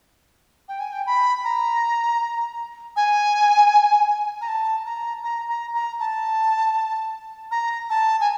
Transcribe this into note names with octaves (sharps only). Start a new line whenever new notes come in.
G5
G#5
G5
B5
A#5
G#5
A#5
A5
A#5
A#5
A#5
A#5
A5
A#5
A5
G#5